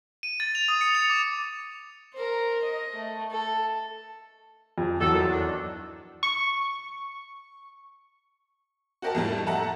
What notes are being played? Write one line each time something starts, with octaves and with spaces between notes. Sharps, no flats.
D#7
A6
F7
D#6
C#7
F7
D6
A#4 C5
D#5
A3
A4
F2
E2 F#3 A4
A#2 D3 D#3
D#3 D4
C#6
F#4 G4 A#4 D#5 A5
F2 A2 G3 A5
A4 D#5 E5 F#5 A5 A#5